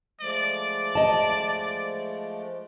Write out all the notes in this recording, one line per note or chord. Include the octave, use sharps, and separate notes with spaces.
F3 G#3 A3 D5
D#5 A5